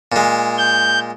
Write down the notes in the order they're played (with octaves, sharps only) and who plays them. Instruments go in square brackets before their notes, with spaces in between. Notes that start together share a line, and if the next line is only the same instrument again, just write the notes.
[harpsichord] A#2 G#3
[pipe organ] G6